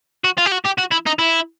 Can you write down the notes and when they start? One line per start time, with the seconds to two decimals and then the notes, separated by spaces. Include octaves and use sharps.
0.24 F#4
0.38 F4
0.46 G4
0.52 F#4
0.66 G4
0.79 F#4
0.92 E4
1.07 D#4
1.19 E4